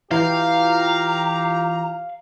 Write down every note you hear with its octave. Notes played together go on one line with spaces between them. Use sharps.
E3 F4 G4 F5 G5 A#5